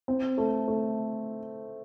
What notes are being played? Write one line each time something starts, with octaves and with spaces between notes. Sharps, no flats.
C4
A3
A3